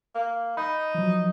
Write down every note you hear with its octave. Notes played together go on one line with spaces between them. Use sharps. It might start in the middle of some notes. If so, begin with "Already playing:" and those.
A#3
D#4 B5
F3 F#3